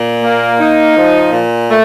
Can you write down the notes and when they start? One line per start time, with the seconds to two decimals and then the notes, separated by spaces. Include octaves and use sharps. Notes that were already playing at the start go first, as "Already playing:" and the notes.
Already playing: A#2
0.22 A#3
0.59 D#4
0.95 F3
1.31 A#2
1.69 A3